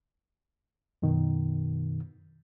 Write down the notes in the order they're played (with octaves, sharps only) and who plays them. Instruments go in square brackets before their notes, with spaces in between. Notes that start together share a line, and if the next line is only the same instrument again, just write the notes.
[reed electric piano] F#2 B2 D#3